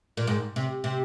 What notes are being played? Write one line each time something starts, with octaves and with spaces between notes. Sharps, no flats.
A#2
G#2
C3
C3